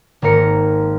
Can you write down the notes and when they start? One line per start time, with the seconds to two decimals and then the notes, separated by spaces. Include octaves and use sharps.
0.22 G#1 A#3 A#4 C#7